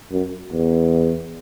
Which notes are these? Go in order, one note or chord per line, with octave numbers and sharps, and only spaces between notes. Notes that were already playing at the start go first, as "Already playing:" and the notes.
F#2
E2